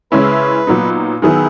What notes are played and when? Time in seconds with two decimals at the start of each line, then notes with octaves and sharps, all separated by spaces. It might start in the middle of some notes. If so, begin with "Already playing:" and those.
0.12 C#3 G#3 C#4 E4 B4
0.67 A#2 F#3 B3 D#4
1.22 D#3 F#3 B3 E4 G#4